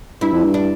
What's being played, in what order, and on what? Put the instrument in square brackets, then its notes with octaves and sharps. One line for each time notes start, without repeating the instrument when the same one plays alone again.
[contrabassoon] G2 [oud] E4
[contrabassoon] F2
G2
[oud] D4